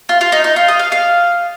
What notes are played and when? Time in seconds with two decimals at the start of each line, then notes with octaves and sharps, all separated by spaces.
0.09 F4
0.21 F4
0.32 D#4
0.44 D#4
0.56 F4
0.68 D#5
0.79 F5
0.92 F5